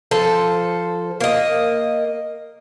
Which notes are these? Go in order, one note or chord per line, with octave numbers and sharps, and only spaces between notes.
F3 A4 C5
A#3 D#5